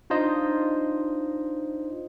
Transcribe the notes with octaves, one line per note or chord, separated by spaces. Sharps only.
D4 D#4 F4 C5 D#5